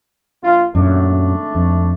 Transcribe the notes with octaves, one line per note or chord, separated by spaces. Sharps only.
A#1 F4
G#1 F#2 A#2 A3 D4
F2